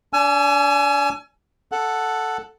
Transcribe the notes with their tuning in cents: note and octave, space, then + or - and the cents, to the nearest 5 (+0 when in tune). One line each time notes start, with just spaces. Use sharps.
D4 -25 G#5 +25 E6 +45
A4 +0 F#5 +0